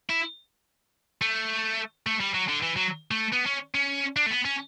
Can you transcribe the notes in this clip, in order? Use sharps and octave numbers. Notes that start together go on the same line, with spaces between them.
E4
A3
A3
G3
F#3
D3
E3
F#3
A3
B3
C#4
C#4
D4
A3
B3
C#4